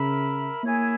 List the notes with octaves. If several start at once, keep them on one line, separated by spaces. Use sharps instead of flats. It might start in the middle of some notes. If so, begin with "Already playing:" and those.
Already playing: C#3 A#4 E5 B5
A#3 E4 G#4 C#5 G#5